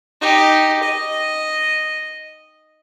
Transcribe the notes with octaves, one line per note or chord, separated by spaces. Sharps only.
D#4 G4
D#5